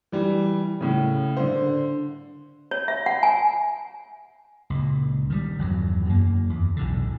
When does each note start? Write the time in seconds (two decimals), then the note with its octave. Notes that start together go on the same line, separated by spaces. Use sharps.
0.12 E3 G3
0.81 A2 C#3
1.37 D3 C5
2.71 C#5
2.88 E5
3.06 F#5
3.23 G#5
4.70 C#2 A#2
5.30 D#3 G3
5.59 G1 E2 F#3
6.05 F#2 A#3
6.50 E2
6.76 B1 A2 D3